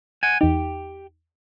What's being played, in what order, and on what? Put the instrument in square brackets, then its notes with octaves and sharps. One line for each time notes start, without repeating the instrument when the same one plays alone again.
[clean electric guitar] F#5 G#5
[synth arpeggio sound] E2 D#4 [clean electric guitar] G4